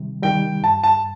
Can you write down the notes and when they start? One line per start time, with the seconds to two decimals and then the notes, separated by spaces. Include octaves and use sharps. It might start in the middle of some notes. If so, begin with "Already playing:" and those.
Already playing: C3 D#3 G3
0.23 D#3 G3 G5
0.62 G2 A5
0.84 A5